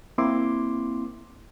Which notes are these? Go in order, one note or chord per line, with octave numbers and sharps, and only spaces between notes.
A#3 C4 E4 C6 D6